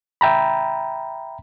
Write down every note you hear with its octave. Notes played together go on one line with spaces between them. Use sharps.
E5 G5 A#5 B5